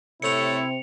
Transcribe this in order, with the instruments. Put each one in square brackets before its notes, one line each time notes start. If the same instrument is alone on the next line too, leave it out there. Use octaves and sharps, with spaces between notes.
[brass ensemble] C3 C4 [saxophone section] A3 A4 C#5 [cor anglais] E4 [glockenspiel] C#7 F7